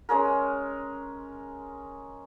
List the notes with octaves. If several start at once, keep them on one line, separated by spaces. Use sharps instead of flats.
G#3 C#4 G#4 A#4